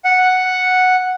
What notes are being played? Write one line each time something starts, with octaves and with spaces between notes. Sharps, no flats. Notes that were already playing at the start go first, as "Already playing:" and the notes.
F#5